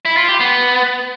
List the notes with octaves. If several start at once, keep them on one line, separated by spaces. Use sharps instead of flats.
E4
F4
G4
B3